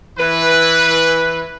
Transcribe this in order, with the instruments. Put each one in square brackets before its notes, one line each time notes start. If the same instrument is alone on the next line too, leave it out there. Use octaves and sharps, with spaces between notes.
[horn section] E3 B4